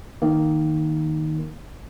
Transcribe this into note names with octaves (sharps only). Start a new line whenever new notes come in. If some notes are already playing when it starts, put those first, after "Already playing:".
D#3 A#3